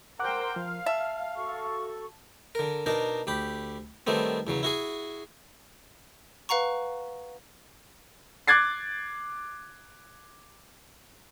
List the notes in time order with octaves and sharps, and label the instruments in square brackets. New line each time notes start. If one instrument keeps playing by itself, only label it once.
[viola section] A#4 C5 G5 [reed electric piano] F#5 D6 F#6
[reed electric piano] F3 [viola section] F5
[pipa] E5 [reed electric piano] A5
[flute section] F#4 A4 C#6
[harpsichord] D3 A#4
B2 D4 D#4 A#4
D2 G4 B5
D#3 G3 A3 B3 C4
E2 C#3 F#3
E4 F#4 G#4
[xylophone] B4 F5 F#5 A#5 C#6
[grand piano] D6 F#6 G#6 A6 C7